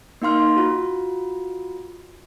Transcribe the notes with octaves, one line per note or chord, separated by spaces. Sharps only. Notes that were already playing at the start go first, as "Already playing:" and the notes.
A#3 D#4 F5 C6 F6
F4 F#4